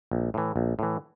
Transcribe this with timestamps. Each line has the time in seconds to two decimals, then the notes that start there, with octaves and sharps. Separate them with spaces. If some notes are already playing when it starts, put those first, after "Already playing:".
0.11 A#1
0.34 A2 E3
0.56 A#1
0.79 A2 E3